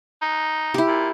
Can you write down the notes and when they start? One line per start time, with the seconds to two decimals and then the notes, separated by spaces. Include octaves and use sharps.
0.22 D#4
0.74 E4 G4
0.87 A#2